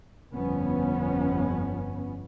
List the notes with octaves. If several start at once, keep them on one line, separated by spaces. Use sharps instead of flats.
G1 F2 B3 C#4